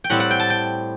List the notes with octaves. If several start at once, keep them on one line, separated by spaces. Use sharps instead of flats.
G5
A2 G3 C4 F#5
F#5
G5
A5
G5